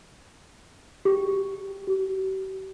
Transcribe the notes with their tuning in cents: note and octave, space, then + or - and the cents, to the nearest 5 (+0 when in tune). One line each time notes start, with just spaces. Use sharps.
G4 -5
G4 -45